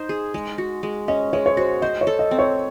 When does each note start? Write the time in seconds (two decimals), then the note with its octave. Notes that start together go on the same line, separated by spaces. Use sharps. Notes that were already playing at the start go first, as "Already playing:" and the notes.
Already playing: D#4 C5
0.09 G#4
0.34 G#3
0.58 F#4
0.83 G#3
1.08 C#4 D#5
1.33 G#3 C#5
1.46 C#5
1.57 F#4 C5
1.82 C5 D#5
2.01 C#5
2.07 A4
2.19 D#5
2.31 C4
2.39 C#5